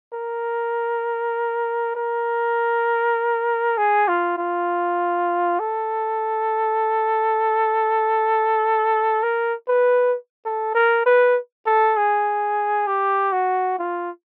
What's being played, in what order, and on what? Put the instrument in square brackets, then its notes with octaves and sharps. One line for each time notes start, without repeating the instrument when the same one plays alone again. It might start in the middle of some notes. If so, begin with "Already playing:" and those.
[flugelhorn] A#4
A#4
G#4
F4
F4
A4
A#4
B4
A4
A#4
B4
A4
G#4
G4
F#4
F4